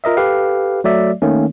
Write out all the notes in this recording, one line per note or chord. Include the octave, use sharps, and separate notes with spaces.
F4 A#4 D#5 E5
G4 A4 B4 F5
F#3 A3 D5 E5
D#3 A3 A#3 C#4